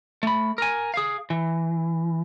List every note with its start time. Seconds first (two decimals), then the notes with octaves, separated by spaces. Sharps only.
0.23 A3 B5
0.58 A#4 G#5
0.94 G#4 F5
1.30 E3